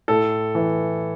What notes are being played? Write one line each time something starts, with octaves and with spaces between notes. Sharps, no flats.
A2 A4
E3